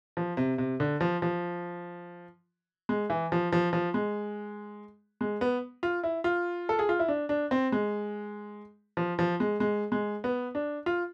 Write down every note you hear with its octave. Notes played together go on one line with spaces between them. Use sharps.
F3
C3
C3
D3
F3
F3
G#3
E3
F3
F3
F3
G#3
G#3
B3
F4
E4
F4
A4
G#4
F4
E4
D4
D4
C4
G#3
F3
F3
G#3
G#3
G#3
B3
D4
F4